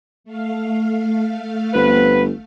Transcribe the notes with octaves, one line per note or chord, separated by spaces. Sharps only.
A3 F5
G1 B3 C4 B4